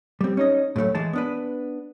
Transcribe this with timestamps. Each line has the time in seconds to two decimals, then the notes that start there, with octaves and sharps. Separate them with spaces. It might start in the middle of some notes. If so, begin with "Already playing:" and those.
0.21 G3 C4
0.37 C#4 D#4 D#5
0.76 A2 F#3 G#3 A3
0.95 E3 G#3 A5
1.13 B3 D4 B4